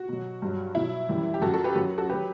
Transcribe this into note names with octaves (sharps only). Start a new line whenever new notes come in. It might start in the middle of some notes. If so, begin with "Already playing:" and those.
Already playing: F#4
B2 F#3
G2 F#3
B2 F#3 E4
F#2 E3 G3
G4
F#2 F#3 F#4 A4
F#4 A4
G4 B4
F#2 F#3 F#4
F#4 A4
F#3 G4 B4